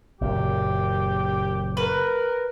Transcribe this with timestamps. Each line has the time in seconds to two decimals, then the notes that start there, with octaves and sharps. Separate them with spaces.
0.21 F#1 F#2 A#2 G4
1.77 A#4 B4